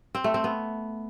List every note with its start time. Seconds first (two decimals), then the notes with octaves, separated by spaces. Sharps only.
0.15 C4
0.24 A3
0.34 C4
0.44 B3